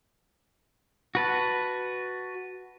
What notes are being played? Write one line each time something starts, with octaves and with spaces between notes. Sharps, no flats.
F#4 B4 A5